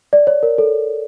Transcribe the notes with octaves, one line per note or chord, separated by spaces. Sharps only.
D5
C#5
A#4
A4